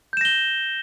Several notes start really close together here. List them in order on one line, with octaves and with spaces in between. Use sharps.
G6 E7 A#6 G7